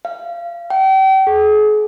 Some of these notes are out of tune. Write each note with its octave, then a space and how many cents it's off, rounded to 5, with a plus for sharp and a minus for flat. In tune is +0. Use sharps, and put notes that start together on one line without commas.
F5 -25
G5 -35
G#4 +35